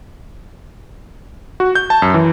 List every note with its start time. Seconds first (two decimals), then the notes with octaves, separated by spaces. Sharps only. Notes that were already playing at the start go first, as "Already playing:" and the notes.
1.60 F#4
1.75 G6
1.90 A5
2.02 F#2
2.14 E3